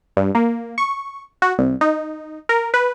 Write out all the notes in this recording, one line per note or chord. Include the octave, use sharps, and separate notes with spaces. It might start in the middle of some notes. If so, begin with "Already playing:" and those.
G2
A#3
C#6
F#4
C2
D#4
A#4
B4